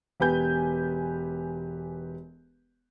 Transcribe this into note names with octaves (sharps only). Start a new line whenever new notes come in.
E1 G4 B4 G#5 G6